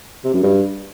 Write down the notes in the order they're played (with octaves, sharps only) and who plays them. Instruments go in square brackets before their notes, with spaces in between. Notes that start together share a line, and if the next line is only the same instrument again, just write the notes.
[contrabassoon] C3
F#2
G2